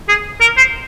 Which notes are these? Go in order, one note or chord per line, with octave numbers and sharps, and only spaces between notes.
G#4
A#4
C5